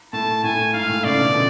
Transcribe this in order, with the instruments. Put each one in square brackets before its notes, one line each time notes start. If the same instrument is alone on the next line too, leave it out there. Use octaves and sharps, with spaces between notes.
[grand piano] A2 [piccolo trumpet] A5
[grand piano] A2 [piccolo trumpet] G#5
[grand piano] G#2 [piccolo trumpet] F5
[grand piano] A2
[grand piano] A2 C#3 [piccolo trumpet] D5
[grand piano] B2 D3
C#3 F3